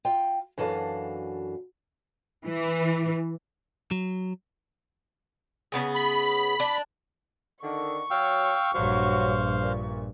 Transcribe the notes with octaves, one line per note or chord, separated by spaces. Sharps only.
F4 G5
F#2 E3 D4 F#4 A4 F5
E3
F#3
C#3 B3 G#4
B5
D4
D3 D#3 C#6
F#3 C#5 F5 G5 E6
A#1 G2 F#3 C5 F5
A#2